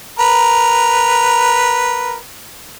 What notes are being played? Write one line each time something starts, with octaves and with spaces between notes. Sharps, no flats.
A#4 B4